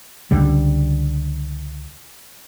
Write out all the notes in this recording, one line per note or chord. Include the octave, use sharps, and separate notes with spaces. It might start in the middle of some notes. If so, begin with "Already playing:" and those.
C#2 D3 G3